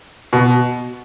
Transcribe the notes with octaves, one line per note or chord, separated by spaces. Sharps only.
B2